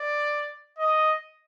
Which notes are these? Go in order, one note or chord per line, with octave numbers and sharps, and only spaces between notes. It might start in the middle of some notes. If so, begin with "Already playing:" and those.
Already playing: D5
D#5